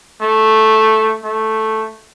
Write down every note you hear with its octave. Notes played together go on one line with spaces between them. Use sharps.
A3
A3